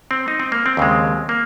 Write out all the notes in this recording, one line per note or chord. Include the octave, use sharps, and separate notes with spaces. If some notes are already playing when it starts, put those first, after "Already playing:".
C4
D#4
C4
A#3
C4
D#2 C#3 G#3
A#3